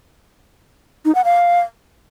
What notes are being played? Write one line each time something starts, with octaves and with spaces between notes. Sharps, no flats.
D#4
F#5
F5